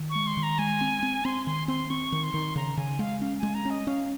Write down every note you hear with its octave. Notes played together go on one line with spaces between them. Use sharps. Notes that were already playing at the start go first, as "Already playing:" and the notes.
Already playing: D#3
C#6
G#3
C6
D#3
A#5
G#3 G#5
C4
C4
C4 C6
D#3 C6
C4 C6
C4 C#6
D#3
C6
D#3
C#3 A#5
C#3 G#5
G#3 F5
C#4 F5
G#3 G#5
A#5
C#4 D#5
C#4 F5